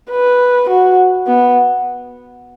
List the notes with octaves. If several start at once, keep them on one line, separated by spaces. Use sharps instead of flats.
B4
F#4
B3